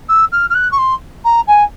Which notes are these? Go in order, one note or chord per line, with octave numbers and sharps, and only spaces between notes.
E6
F6
F6
F#6
C#6
C6
A#5
G#5